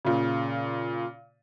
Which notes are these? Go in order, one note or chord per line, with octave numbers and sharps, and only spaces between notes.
A#2 C#3